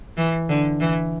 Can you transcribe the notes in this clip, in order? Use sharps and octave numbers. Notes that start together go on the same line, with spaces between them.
E3
D3
E3